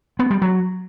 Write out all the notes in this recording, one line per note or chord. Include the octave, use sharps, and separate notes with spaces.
B3
G3
F#3